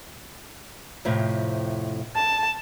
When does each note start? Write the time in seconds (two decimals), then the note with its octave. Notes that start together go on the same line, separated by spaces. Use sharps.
1.05 F2 A2 C3
2.16 A5